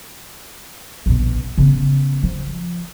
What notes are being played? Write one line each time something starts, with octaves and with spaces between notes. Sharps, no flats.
A#1 B2
C#3 B3
F3